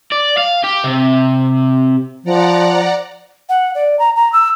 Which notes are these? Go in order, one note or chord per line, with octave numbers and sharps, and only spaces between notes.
D5
F5
G4
C3
F3 D5 F#5 A#5
F#5
D5
A#5
A#5
E6